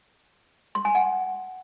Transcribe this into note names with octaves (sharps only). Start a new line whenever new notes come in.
C6
G#5
F#5